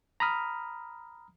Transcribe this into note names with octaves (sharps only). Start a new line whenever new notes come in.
A#5 B5 D#6 F6